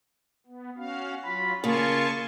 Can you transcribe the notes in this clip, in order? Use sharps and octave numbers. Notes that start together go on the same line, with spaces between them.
B3
C#4 F#4 F5
F#3 F4 B5
C#3 A#3 F4 G#5 A5 C#6